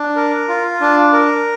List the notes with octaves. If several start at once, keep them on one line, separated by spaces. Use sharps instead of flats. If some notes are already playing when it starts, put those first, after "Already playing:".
Already playing: D4
A#4
F4
D4
A#4